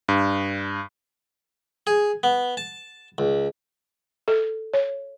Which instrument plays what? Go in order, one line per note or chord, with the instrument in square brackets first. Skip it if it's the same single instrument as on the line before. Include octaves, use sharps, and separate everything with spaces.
[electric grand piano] G2
[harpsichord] G#4
B3
A5
C#2
[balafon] A4
C#5